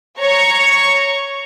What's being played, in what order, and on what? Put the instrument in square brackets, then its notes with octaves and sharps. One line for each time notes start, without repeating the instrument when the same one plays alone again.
[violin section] C#5 A#5 C#6